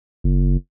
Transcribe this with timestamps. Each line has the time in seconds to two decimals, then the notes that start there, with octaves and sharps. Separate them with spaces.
0.24 F#1